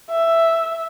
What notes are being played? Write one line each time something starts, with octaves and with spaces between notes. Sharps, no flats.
E5